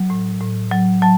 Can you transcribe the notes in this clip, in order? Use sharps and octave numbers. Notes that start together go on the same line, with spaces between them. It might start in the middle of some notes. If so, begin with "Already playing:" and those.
Already playing: F#3
A2
A2
F#3
F#3 A5